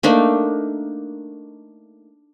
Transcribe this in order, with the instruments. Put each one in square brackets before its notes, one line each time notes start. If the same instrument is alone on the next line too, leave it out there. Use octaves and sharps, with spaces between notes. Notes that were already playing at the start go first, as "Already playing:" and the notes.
[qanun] A3 A#3 D4 D#4